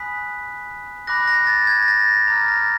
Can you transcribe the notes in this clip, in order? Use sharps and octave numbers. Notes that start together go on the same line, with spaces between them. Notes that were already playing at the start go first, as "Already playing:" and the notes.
Already playing: G#5 B5 D#6 F#6 B6
B5 D6 F#6 A#6
A#6
A6
G#6
A#6
A6
A#6
A#5 D6 F6 A6
A#6
A6